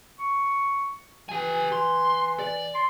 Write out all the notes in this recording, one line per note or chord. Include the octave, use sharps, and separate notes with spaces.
C#6
E3 G4 G#5
C6
D5
C6